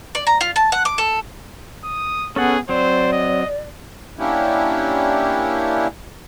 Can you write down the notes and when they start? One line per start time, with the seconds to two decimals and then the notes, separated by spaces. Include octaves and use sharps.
0.15 D5
0.27 A#5
0.41 F4
0.56 A5
0.72 F#5
0.85 D6
0.98 A4
1.84 D#6
2.36 B3 C#4 G#4 A4 F#5
2.69 F#3 C4 C5 D5
3.12 D#5
4.19 A#3 C#4 D4 E4 G4